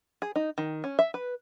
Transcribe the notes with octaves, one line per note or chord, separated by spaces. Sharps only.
G#4
D#4
D#3
C#4
E5
B4